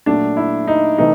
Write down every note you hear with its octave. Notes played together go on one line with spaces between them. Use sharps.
A#2 F#3 A3 D4
E4
D#4
C3 E3 A3 D#4